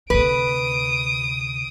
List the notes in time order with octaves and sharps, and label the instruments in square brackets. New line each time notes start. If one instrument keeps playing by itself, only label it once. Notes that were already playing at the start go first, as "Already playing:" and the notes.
[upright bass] D2 C3 [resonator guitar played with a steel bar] B4 [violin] D#6 D7